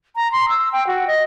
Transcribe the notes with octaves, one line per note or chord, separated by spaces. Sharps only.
A#5
C6
E6
G5
F#4
D#5